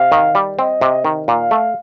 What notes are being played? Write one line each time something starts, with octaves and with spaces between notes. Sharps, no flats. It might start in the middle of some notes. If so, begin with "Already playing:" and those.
Already playing: C3 F5
D#3
G3
C4 D#5
C3
D#3
A#2 F5
A3